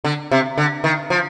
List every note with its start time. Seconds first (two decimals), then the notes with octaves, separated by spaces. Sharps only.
0.04 D3
0.31 C3
0.58 D3
0.84 D#3
1.10 F3